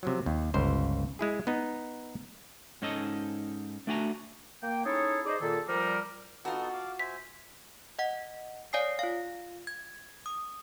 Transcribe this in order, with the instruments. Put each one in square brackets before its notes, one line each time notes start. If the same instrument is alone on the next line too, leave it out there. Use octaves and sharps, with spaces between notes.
[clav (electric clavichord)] C3 F3 F#3
D#2
G1 C#2 C5
G#3 E4 G#4
B3 D#4
[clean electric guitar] G#2 C#4 D#4 A4 D#5
A3 D4 F#4 G#5 A#5
[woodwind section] A#3 G5
C#4 D#4 E4 G#4 A4 C#5
D#4 G#4 C5 D5 D#5
A#2 D#3 G#4 A4
F3 G3 A#4
[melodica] B3 D#4 A4 [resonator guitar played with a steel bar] F4 F#4
[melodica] F5 D6
[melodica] C5 E5 G#5 [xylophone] B6
[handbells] D#5 F#5
C#5 D5 F5 G#5 D#6 C7
F4 F5
G#6
D#6